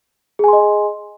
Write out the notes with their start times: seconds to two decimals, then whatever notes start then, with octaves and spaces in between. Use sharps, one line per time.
0.39 G#4
0.44 G#5
0.48 C6
0.53 D#5